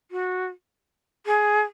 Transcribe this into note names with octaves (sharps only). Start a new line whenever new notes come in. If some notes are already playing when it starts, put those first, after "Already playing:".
F#4
G#4